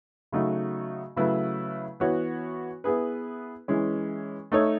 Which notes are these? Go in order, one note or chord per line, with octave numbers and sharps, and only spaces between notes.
C#3 F#3 A3 D#4 F#4
C#3 F#3 A3 E4 B4
E3 B3 F#4 C#5
B3 E4 G#4 B4
E3 G#3 C#4
A3 D#4 A4 C#5